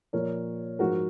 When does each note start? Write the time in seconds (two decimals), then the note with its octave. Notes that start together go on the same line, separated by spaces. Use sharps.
0.13 A#2 F3 A#4 C#5
0.79 G#2 F3 F#4 A#4